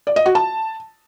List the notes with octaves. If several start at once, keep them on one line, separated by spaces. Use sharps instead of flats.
D5
D#5
F#4
A5